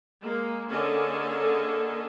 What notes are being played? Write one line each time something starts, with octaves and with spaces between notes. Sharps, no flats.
G#3 A#3
D3 A#3 C#4 G#4 A4 D#5